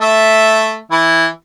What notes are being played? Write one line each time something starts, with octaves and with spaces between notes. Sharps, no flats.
A3 E5
E3 E4